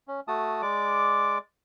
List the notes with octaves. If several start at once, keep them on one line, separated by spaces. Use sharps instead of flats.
C#4
A3 F#4 A5 D#6
G#3 D5 D6